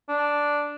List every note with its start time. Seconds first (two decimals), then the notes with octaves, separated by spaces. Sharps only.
0.09 D4